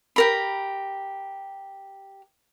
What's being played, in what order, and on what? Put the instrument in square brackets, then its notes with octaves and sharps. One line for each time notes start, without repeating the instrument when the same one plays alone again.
[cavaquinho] G4 A#4 B5